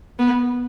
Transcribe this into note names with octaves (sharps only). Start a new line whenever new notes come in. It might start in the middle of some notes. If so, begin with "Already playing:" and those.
B3